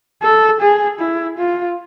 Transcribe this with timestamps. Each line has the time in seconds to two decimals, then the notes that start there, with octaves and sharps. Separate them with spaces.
0.23 A4
0.61 G#4
1.00 E4
1.38 F4